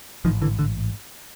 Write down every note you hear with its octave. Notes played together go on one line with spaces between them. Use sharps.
A1 G#2 D#3 F3
D3 E3
D3